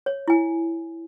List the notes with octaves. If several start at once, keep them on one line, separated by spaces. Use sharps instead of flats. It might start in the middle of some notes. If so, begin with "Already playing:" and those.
C#5
E4 G#5